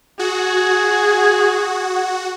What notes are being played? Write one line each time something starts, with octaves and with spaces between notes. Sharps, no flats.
F#4 G#4